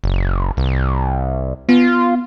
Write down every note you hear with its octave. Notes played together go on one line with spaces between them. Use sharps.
F#1
C2
B3 F4